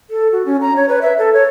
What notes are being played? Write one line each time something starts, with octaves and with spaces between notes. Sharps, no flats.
A4
F#4
C#4
A#5
C#5
B4
E5
A4
C#5